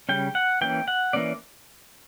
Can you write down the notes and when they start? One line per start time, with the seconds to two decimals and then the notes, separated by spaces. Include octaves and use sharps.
0.09 C#3 G3 C#4 G5
0.35 F#5
0.61 E3 A#3 C#4 G5
0.88 F#5
1.13 E3 A#3 C#4 D5